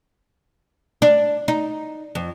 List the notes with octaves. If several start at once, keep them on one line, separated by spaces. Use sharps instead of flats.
D4
D#4
F2